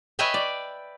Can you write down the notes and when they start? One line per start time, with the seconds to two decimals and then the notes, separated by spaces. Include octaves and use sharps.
0.19 B4 C#5 D#5 E5 G5 G#5
0.34 D5